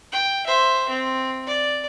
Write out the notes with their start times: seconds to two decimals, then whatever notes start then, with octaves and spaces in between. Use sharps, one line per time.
0.12 G5
0.47 C5 E5
0.89 C4
1.46 D5